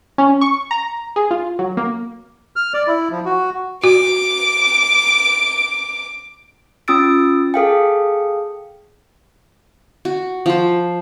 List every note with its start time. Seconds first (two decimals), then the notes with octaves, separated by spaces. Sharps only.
0.18 C#4
0.41 C#6
0.71 A#5
1.16 G#4
1.31 F4
1.59 F#3
1.77 A#3
2.56 F6
2.74 D5
2.87 E4
3.11 F3
3.25 F#4
3.84 F#4 D6
6.88 C#4 F4 D#6 E6 A6 D7
7.54 G#4 A4 F5 G5
10.05 F#4
10.46 F3 C5